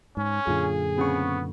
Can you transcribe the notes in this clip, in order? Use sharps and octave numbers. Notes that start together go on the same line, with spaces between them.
G#2 C#4
F#2 A#2 D3 F4 G#4
C#3 B3 C4 C#6